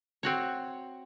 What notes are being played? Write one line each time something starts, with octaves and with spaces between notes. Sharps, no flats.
C4 F#4 C#5